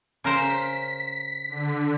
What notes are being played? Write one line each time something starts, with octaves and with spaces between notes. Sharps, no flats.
C#3 A#4 C5 B6
D3